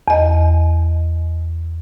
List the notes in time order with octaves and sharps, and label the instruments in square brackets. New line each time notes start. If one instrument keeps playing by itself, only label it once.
[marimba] E2 D#5